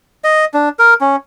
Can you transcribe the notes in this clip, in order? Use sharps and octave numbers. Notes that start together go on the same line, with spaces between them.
D#5
D4
A#4
C#4